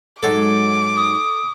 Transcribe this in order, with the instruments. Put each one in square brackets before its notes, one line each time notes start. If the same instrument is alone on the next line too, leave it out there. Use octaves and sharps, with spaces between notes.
[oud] G#2 F#3 G#3 [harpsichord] A4 [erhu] D6
[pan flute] D#6